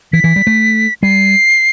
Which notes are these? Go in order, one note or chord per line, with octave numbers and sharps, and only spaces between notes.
E3 B6
E3
G3
A3
G3 C7